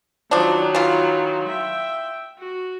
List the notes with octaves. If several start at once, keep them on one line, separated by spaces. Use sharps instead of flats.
D#3 F3 F#3 D4
E3 F4
E5 G5
F#4